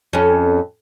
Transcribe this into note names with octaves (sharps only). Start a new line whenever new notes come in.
F2 C#4